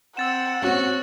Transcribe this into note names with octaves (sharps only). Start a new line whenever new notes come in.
C4 F#5 E6 A6 E7
C4 C#4 F#4